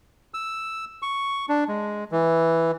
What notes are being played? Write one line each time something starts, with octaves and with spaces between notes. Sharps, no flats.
E6
C#6
D4
G#3
E3